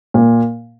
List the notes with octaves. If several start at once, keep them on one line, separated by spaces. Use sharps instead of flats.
A#2